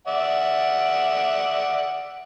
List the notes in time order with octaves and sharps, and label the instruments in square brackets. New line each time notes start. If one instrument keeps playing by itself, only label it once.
[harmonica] D5 E5 F#5